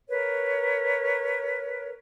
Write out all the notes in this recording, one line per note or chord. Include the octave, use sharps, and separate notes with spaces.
A#4 B4 C#5